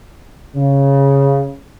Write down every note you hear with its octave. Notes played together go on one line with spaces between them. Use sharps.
C#3